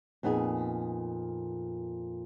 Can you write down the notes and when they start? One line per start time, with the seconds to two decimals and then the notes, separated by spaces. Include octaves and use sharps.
0.23 F2 A#2 B3 D#4 G#4